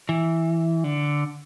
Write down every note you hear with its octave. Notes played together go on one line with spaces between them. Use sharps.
E3
D3